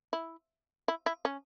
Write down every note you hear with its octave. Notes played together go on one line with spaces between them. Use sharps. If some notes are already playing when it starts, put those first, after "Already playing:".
E4
E4
E4
C#4